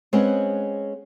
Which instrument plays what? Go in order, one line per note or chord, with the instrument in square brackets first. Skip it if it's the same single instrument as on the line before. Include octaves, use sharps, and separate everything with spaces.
[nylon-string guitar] G#3 C4 C#4 G#4 B4 F#5